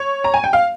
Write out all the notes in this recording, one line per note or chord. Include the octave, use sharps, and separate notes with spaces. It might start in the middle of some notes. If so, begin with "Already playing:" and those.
Already playing: C#5
A#5
G#5
G5
F5